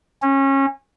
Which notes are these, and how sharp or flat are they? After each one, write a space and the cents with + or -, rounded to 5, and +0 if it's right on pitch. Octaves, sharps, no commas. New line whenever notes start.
C#4 -25